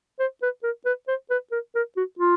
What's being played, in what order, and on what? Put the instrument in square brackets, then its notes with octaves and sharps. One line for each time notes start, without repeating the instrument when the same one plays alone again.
[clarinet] C5
B4
A#4
B4
C5
B4
A#4
A#4
F#4
F4